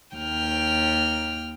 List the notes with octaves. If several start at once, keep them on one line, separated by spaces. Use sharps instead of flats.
D#2 G5 F6